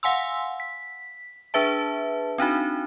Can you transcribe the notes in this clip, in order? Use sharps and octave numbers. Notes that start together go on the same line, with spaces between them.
F5 F#5 G#5 C6 E6
B6
D4 G#4 B4 E5 A5
C4 D4 D#4 F#4